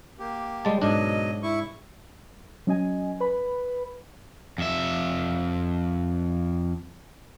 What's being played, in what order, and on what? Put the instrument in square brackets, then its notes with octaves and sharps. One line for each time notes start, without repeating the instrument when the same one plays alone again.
[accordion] A#3 G4
[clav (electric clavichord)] G3 G#3 A5
[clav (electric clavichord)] G#2 D4 [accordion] B2 F#3 D#5
[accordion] E4 C#6
[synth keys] F#3 C#4 D#5 G#5
B4 B5
[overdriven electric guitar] F2 E5